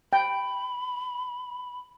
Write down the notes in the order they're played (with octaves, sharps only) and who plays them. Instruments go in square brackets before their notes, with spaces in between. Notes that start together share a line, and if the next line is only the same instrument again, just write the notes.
[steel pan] G5 [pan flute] B5